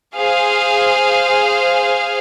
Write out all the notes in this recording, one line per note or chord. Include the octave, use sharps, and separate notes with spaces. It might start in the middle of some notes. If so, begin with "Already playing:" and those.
G#4 C5 F5